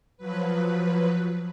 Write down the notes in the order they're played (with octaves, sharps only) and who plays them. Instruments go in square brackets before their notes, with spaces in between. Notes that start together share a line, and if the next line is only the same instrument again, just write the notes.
[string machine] F3 F#3 B4